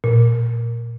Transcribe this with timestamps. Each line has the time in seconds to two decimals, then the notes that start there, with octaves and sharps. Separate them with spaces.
0.04 A#2